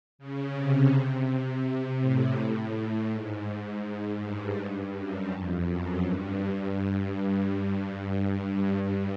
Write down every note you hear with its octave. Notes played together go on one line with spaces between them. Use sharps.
C#3
C3
C3
C3
A2
A2
G#2
G2
F#2
F2
F#2
G2